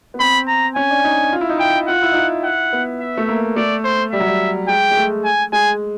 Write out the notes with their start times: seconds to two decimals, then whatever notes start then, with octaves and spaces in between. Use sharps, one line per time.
0.14 B3
0.20 C4 B5
0.48 A#5
0.76 C#4 G#5
0.90 D4
1.04 D#4
1.32 F4
1.41 E4
1.49 D#4
1.58 E4 G5
1.88 F4 F#5
2.02 E4
2.12 D#4
2.16 E4
2.44 F#5
2.73 B3
3.01 E5
3.17 A3
3.29 A#3
3.56 A3 D5
3.85 C5
4.12 G3 E5
4.20 F#3
4.27 G3
4.68 G#3 G5
4.91 G#3
4.97 A3
5.25 G#5
5.52 G#3 G#5